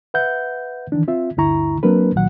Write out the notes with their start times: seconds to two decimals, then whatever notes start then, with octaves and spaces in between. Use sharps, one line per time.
0.14 B4 E5 F#5 G6
0.92 D#3 E3 D4
1.08 C4 F4 E5
1.37 D2 G2 D3 E4 A#5 C#6
1.83 F#3 A#3 C4 D4 A#4 B4
2.15 C2 A#2 D#3 F#3 F#5